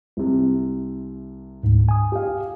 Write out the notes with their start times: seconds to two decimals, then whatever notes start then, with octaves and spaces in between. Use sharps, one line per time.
0.17 C2 C3
1.63 D2 G#2
1.89 G#5 D#6
2.12 G4 F5